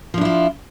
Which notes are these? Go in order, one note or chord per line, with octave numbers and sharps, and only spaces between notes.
F3 D4 E4 F4